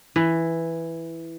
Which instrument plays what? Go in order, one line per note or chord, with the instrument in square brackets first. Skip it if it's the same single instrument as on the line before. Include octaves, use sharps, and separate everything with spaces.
[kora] E3